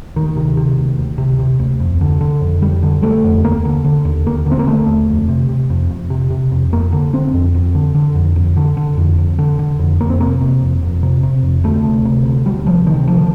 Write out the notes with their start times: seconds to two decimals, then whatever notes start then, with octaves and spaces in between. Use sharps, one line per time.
0.16 D2 D#3
0.36 C3
0.57 C3
0.78 D2
0.99 D2
1.18 C3
1.39 C3
1.59 D2
1.80 F2
2.01 D3
2.21 D3
2.41 F2
2.62 F2 G3
2.83 D3
3.02 D3 A3
3.24 F2
3.44 D#2 A#3
3.65 D3
3.84 D3
4.05 D#2
4.26 D#2 A#3
4.46 D3
4.51 C4
4.59 A#3
4.67 D3 A3
4.87 D#2
5.08 F2
5.28 C3
5.49 C3
5.70 F2
5.90 F2
6.10 C3
6.30 C3
6.52 F2
6.72 F2 A#3
6.92 D3
7.13 D3 C4
7.34 F2
7.55 F2
7.75 D3
7.95 D3
8.15 F2
8.36 F2
8.57 D3
8.77 D3
8.98 F2
9.18 F2
9.39 D3
9.59 D3
9.79 F2
10.00 F2 A#3
10.10 C4
10.20 C3 A#3
10.40 C3
10.62 F2
10.83 F2
11.03 C3
11.23 C3
11.43 F2
11.64 D2 A3
11.84 C3
12.05 C3
12.25 D2
12.46 D2 G3
12.66 C3 F3
12.87 C3 D#3
13.08 D2 F3